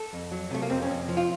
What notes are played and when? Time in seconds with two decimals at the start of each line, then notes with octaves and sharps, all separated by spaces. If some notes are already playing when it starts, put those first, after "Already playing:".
Already playing: A4
0.13 F2
0.31 F#3
0.51 C3 A3
0.62 A#3
0.70 F2 C4
0.83 C#4
0.90 F2
1.09 F3
1.17 F4